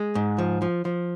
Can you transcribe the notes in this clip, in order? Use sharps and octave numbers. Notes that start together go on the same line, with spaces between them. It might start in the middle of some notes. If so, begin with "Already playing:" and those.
Already playing: G#3
G#2
F3
F3
F3